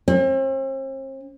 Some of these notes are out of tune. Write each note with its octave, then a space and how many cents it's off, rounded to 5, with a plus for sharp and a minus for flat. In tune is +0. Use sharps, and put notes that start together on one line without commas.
C4 +45